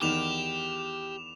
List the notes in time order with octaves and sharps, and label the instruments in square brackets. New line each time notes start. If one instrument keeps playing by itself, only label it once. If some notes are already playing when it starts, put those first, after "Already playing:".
[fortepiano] E2 D#3 [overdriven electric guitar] G4 [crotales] D6 E7 F7